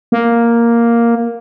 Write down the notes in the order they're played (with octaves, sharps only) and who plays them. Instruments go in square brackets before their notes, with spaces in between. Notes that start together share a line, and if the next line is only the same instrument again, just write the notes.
[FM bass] A#3